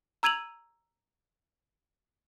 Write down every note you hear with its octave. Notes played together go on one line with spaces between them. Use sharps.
A#5 E6 G#6 D#7 F7 F#7